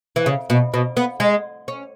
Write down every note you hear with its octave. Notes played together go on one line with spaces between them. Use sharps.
E3
C#3
B2
B2
B3
G#3
C#4